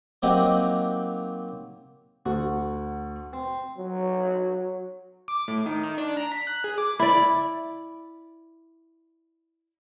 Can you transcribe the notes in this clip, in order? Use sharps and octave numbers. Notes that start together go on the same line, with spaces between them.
F#3 A#3 C4 D#4 F#4 G4
D2 F#4 A4
C4
F#3
D6
A2
D#3
D#3
D4
A#5
B6
F#6
G#4
D6
E4 D5